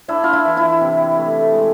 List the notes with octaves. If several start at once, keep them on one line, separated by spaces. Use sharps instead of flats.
D4 E4
F4
E4
E3
E4
C3
A3
G#3